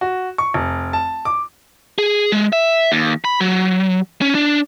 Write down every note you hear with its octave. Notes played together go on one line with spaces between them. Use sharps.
F#4
C#6
F1
A5
D6
G#4
G#3
E5
D#2
B5
F#3
C#4
D4